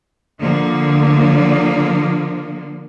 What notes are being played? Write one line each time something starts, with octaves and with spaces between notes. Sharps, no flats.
D3 F3 A#3